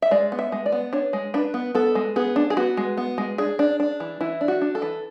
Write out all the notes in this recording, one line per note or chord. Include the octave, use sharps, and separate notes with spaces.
E5
G#3 D5
B3
E5
G#3
D5
B3
D4 C#5
G#3
D4 B4
B3
B3 A4
G#3
B3 G#4
D4
G#4
B3 F#4
G#3
B3
G#3
D4 G#4
D4
D4
E3
E3 E4
D4
F#4
D4
A4
E3